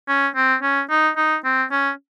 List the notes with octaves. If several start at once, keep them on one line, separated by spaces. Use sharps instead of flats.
C#4
C4
C#4
D#4
D#4
C4
C#4